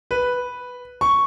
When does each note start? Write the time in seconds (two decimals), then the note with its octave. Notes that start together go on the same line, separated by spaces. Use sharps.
0.11 B4
1.01 C#6